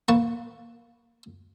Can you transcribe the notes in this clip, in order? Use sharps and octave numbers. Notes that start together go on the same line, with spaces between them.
A#3 B4 A5 C#6